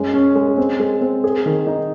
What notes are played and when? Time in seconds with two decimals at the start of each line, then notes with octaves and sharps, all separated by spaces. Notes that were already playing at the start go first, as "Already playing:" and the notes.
Already playing: F#2 G#3
0.13 C#4
0.35 G#3
0.57 C4
0.80 G#3
1.01 C4
1.24 G#4
1.46 D#3
1.67 D#4